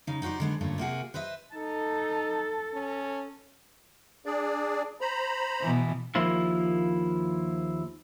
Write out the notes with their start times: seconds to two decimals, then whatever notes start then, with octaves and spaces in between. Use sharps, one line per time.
0.07 C#3 D#4
0.22 D#4 F#4 B4 C5 D5
0.40 D3 G#3 B3
0.61 G2 A#2 D3 A3 C#4
0.78 C3 A#3 F#4 G#4
1.14 B4 C5 D#5 E5
1.54 D#4 A4
2.74 C#4
4.26 D4 G#4 D5
5.01 C5 A#5 B5
5.61 B2 E3
6.15 D#2 F3 A#3 E4 F4